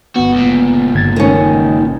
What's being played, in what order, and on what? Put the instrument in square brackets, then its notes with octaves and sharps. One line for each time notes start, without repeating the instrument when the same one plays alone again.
[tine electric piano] G1 B3 [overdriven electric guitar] F#4
[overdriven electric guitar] C#2 A#2
[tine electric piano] G1 G#6 A6
[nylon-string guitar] D#3 C#4